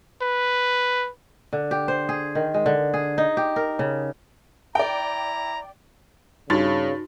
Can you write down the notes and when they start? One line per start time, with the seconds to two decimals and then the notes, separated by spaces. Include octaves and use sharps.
0.22 B4
1.53 D3
1.71 G4
1.88 C5
2.09 G#4
2.35 D#3
2.54 G#3
2.66 D3
2.94 G#4
3.18 D#4
3.37 G4
3.56 A#4
3.79 C#3
4.75 E4 D5 G5 A#5
6.50 G2 C#3 D#4 F#4 C6 A6